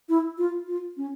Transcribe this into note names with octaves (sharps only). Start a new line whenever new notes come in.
E4
F4
F4
C#4